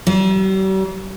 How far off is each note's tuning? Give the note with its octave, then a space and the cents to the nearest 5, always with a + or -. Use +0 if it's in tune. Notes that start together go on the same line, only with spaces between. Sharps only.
G3 -45